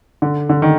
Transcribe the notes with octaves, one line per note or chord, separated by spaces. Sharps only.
D3
D3
D#3